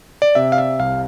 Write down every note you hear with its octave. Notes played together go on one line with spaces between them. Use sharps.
D5
C3 E5
F5
E5
C2 F5